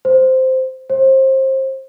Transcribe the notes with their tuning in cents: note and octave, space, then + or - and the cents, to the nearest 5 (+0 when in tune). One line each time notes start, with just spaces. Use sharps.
C5 -5
C5 +25